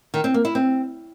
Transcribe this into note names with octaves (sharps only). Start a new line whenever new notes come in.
D#3
C4
A#3
E4
C4